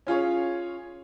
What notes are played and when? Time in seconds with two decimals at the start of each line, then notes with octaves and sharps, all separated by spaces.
0.07 C#4 F4 G#4 C#5